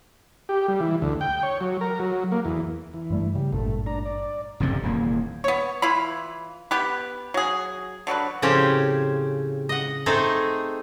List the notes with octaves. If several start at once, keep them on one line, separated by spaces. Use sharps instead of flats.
G4
G3
E3
D2
G5
C#5
F#3
A#4
F#3
A#3
E2
E3
G2 G3 A3
C#3 G3
G#1 G2 A#2 A3
D4 A#5
D5
F1 F2 G#2 C3
D#1 E2 A#3
B3 C#5
E3 E4 F4 B5
B3 G4 B4
F#3 G#4
D3 F#3 G3 B4
A2 C#3 F3 C4 C#4 G4
D#5 F#5
A3 C4 D#4 G#4 A4